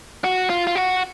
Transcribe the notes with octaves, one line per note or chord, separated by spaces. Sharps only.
F#4
F4
F4
F#4